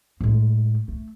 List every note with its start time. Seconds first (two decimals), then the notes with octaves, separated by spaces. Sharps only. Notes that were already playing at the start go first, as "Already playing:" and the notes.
0.21 A2 G#3
0.88 A3